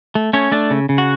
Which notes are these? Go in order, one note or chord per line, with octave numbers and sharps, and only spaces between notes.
A3
A3 C#4 C#5
A3 D4 D5
C#3
C#3
F#4 F#5